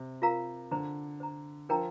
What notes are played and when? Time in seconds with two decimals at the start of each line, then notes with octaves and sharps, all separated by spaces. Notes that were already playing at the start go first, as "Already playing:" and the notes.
Already playing: C3
0.22 F4 A#4 F5 A#5
0.71 D3 C5 A#5
1.20 C5 A#5
1.69 F3 D4 A#4 G5 A#5